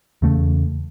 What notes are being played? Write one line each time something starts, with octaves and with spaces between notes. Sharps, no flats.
E2 C#3 A3